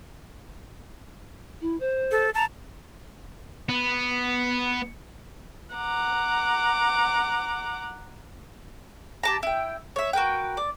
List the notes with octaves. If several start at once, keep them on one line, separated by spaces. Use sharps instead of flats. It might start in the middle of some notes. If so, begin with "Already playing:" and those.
E4
C5
A4
A5 A#5
B3
F#5 A#5 D6
G4 A5 A#5
E4 G5
C#5 E5
F#4 A#4 B4 G5
D5